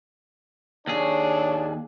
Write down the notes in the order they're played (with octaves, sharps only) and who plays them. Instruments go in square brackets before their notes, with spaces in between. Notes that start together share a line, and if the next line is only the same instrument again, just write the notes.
[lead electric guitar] D#2 G#4 [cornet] D4 [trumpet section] C#5